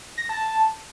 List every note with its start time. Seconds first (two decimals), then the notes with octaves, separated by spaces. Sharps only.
0.18 A#6
0.29 A5
0.41 A5